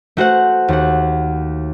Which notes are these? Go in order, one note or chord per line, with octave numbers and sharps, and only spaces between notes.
A3 F#4 C5 F#5
D#2 F#5